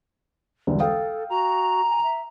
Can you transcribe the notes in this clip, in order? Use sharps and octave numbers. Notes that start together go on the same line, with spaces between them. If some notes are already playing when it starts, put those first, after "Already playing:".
E1 C2 D3
A4 F5 G5 D#6
F#4 A#5
G#5
E5